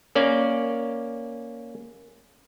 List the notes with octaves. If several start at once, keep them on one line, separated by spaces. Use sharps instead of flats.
A#3 C#4 D5